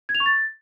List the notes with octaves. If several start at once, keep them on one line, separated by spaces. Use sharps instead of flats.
G#6
F7
C#6
A6